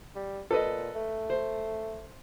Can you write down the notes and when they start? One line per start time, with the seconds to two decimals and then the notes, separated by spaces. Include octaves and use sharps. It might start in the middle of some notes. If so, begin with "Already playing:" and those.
0.16 G3
0.51 A#2 A4 B4 D#5
0.95 A3
1.30 C5